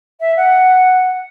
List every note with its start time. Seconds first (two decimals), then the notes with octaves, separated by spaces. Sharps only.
0.20 E5
0.37 F#5